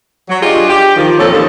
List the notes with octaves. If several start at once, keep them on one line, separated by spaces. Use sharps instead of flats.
F#3
D4 F4 G4 G#4 D#5
G4
D#3 F3
F2 A#2 C#4 A4
D#2 F3